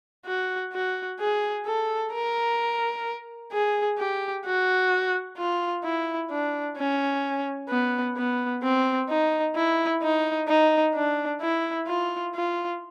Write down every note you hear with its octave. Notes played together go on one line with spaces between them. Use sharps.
F#4
F#4
G#4
A4
A#4
G#4
G4
F#4
F4
E4
D4
C#4
B3
B3
C4
D#4
E4
D#4
D#4
D4
E4
F4
F4